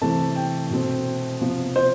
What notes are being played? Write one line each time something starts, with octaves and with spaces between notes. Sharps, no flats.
C3 E3 A3 A5
G5
B2 A3 C4
C3 F3 B3
C5